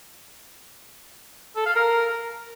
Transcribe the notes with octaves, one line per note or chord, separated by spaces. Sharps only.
A4
F5
A#4